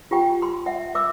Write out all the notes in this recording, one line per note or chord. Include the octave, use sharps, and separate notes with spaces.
F4 G4 G5
C6
E5 F#5
E5 D6 E6